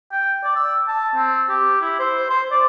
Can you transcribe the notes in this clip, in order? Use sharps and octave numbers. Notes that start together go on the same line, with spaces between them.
G5
D5
E6
A5
C4
G4
E4
C5
C5
D5